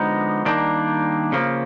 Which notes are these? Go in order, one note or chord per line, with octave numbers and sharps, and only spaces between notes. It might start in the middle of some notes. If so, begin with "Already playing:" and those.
Already playing: D3 F3 G#3 B3 D#4
D#3 G3 A#3 D4
C#3 F3 A#3